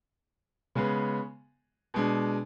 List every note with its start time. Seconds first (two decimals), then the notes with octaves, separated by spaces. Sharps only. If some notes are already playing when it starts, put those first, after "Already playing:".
0.75 C#3 G#3 B3
1.94 B2 G#3 D4